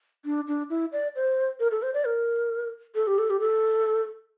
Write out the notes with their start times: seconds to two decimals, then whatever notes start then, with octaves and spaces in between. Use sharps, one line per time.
0.25 D4
0.47 D4
0.70 E4
0.92 D5
1.16 C5
1.60 A#4
1.71 A4
1.82 C5
1.94 D5
2.05 A#4
2.95 A4
3.07 G4
3.19 A4
3.30 G4
3.40 A4